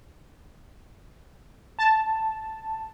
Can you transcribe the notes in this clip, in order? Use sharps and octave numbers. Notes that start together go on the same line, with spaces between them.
A5